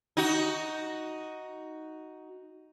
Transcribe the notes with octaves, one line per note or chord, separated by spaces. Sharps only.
D#4 F#4